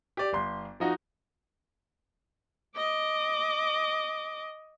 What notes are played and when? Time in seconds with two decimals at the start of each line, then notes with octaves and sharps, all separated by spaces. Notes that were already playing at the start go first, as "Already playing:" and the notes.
0.17 G4 D5
0.33 G1 C6
0.80 F3 D#4 F#4
2.77 D#5 D6